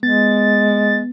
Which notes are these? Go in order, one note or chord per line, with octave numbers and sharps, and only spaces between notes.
G#3 B3 A6